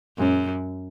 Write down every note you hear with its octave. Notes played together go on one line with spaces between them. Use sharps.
F#2 A#2 G#3 C#4